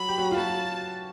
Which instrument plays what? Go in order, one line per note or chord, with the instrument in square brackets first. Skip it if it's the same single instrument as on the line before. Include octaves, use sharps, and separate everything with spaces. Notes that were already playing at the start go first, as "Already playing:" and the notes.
Already playing: [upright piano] F#3 F#4 [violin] B5
[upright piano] G4
F#3 F#4
F4
[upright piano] F#3 F#4 [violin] A5